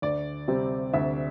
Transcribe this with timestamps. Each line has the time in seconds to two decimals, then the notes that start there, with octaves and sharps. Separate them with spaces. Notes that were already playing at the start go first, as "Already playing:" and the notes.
0.02 D2 D5
0.48 C3 G3 C4
0.93 D2 E5